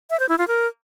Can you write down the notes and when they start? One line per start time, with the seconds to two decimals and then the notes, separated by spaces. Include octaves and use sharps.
0.10 E5
0.20 C5
0.29 E4
0.38 F4
0.48 A#4